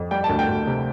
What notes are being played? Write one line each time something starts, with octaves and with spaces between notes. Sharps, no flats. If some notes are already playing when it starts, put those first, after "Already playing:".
Already playing: F2
G3 G5
A5
D2
G5
D2
C3